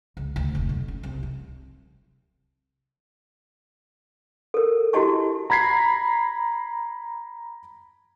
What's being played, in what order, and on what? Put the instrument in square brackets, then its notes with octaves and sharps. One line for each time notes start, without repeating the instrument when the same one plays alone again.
[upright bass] C#2
D2
F1
B1
C#4
C2
F3
[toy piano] A4 A#4
E4 F#4 G4 D#5 A5 C#6
[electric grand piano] A#5 B5 G#6 B6 C7